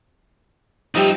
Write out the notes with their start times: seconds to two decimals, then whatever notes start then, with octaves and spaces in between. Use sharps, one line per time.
0.96 F3 G3 D#4 G4 E5 G5